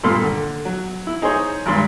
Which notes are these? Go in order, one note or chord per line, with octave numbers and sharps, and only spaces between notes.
G2 A#2 A4 C6 F6
D3
F#3
E4
D#4 G#4 C5 C#5
G#1 G2 C6